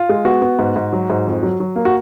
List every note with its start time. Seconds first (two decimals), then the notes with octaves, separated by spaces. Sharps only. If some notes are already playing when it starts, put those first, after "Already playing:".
Already playing: F4
0.09 G#3
0.25 B3 F#4
0.42 B3
0.59 G#2
0.76 G#2
0.93 F#3
1.10 G#2
1.27 F2
1.43 F#3
1.60 F#3
1.76 A#3
1.85 F#4